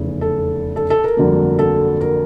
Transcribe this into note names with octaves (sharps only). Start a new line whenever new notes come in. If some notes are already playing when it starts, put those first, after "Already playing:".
Already playing: F1 E2 C#3
A4
A4
A4
A#4
G1 F2 D3 F#3 A#3
A4
A#4